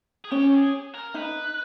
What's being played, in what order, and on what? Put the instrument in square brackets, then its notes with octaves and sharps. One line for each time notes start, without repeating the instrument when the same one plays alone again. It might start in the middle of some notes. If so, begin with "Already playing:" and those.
[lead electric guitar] G#4
[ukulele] C#4 [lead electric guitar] G4
[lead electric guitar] G#4
A#4
[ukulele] D#4 [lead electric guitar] B4